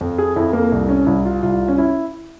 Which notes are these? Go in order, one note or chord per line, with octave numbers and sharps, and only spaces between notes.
F2
G#4
F2 E4
A#3
C2
C#4
C2 E4
F4
C2 F4
C#4
E4